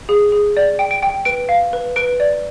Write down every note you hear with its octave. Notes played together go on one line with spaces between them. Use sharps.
G#4
G#4
D5
G5
D7
G5
B4 D7
F5
B4
B4 D7
D5